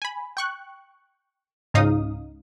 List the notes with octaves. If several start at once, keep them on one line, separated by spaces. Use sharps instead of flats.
G#5 B5
G5 C#6 F#6
C#2 G#2 C#4 D#4 F5 D#6